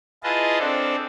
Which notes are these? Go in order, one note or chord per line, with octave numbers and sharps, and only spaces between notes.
E4 F4 G#4 B4 D#5 A5
C4 D4 A4